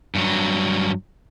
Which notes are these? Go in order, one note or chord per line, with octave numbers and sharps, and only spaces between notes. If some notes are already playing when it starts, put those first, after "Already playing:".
G2 F#3